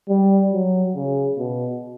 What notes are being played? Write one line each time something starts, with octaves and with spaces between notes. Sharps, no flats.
G3
F#3
C#3
B2